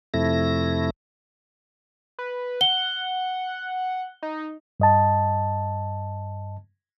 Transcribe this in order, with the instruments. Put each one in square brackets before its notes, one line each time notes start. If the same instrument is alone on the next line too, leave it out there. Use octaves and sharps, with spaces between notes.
[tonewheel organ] F2 C3 A3 E4 A#6
[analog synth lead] B4
[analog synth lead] F#5 [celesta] G7
[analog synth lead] D#4
[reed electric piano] G2 D#5 A5